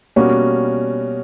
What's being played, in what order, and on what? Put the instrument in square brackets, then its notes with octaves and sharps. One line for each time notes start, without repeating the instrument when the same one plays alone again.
[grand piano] B2 G3 A#3 C#4 F#4